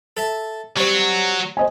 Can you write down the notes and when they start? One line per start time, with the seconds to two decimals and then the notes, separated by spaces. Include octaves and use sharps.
0.17 A4 E5 A5
0.77 F#3 G3 C4 F#4
1.57 C5 D#5 G#5